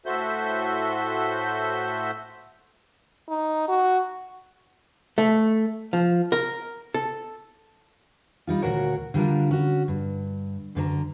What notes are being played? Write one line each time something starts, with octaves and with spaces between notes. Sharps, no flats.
A2 F#4 A4 C5 E5 G6
D#4
F#4
A3
F3
A#4
A4
G3 D#4 F4
D2 A#2 F#4 A#4 C#5
D3 G3 D4 F4 A#4
C#4 F#4
G2
F#2 D3 B4 A#5